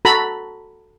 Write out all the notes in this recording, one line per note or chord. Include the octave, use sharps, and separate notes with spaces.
F#4 A4 A#5 B5